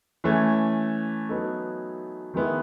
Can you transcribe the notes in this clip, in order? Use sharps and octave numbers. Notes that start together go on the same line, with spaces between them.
E3 A3 C#4
F#3 B3 D#4 A4
D#3 G#3 B3 E4